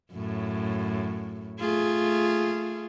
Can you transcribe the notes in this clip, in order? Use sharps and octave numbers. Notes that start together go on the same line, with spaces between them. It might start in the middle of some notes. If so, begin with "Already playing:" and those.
F#2 A2
A3 F4 G#4